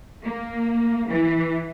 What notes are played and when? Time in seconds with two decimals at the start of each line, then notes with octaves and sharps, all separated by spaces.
0.23 A#3
1.08 E3